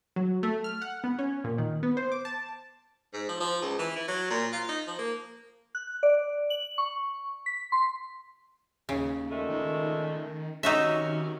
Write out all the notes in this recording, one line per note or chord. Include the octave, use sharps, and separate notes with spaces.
F#3
A3
F6
F#5
B3
C#4
A#2
D#3
B3
C5
D6
A5
G#2
F3
F3
C#2
E3
E4
F#3
A#2
F4
D#4
F3
A#3
F#6
D5
F#7
C#6
B6
C6
D#2 C#3
A#2 G#3 A3
D#3
C3 D#3 F#3 C#4 D#4 F#4 E5